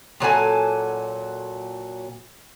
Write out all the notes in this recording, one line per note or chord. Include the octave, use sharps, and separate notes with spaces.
A#2 F#3 A4 G#5